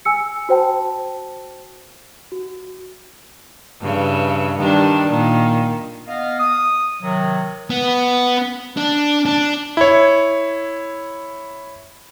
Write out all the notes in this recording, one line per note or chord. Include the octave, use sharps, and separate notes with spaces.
G#5 E6 C#7
F#4 C5 G5 A5
F#4
G2 C#3 E3
D#3 G3 D4
A#2 D#3
B3 D#5 F5
D#6
C3 D#3 F#3
B3
D4
D4
E4 C#5